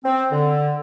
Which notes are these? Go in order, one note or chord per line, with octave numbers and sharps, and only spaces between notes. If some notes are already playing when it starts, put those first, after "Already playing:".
C4
D3